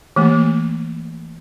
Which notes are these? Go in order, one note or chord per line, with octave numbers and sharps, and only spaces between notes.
E3 A3 A#3